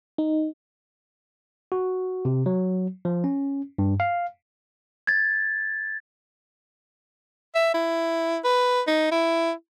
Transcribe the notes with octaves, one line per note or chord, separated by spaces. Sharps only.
D#4
F#4
C3
F#3
F3
C#4
G2
F5
G#6 A6
E5
E4
B4
D#4
E4